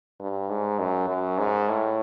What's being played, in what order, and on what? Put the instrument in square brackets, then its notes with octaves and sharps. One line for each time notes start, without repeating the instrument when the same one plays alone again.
[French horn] G2
G#2
F#2
F#2
G#2
A2